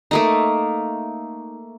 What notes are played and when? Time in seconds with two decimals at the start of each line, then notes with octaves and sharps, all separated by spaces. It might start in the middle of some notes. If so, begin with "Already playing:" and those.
0.11 A3 A#3 D#4